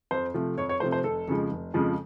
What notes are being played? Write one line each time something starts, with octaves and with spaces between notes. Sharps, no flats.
F2 C5
C3 F3 A3
F2 C#5
C#5
C3 F3 A3 C5
C5
F1 A4
F2 C#3 F3 G#3
F1
F2 C#3 F3 G#3